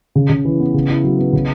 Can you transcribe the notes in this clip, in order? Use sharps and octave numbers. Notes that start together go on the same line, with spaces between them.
C#3
C#3
E3
B3
C#3
E4
F#3
B3
C#3